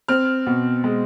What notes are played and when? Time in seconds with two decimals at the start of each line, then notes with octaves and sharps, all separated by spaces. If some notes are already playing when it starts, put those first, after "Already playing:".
0.08 C4 F6
0.46 B2
0.84 G#3